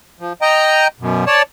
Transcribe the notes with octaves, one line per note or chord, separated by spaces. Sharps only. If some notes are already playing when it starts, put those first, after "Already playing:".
F3
D#5 G5 A#5
F#2 B2
C#5 D5 A5